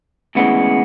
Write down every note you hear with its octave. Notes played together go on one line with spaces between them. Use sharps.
D2 C#3 E3 G#3 B3